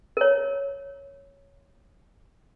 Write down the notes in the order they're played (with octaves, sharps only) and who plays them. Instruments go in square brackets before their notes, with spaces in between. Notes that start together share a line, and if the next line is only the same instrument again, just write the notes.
[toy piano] A#4 C#5